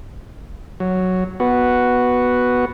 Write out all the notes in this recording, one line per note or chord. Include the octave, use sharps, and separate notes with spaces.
F#3
B3 F#4